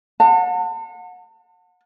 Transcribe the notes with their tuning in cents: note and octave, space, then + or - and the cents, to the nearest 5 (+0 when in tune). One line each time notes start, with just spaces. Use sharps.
F#5 -30 A5 +40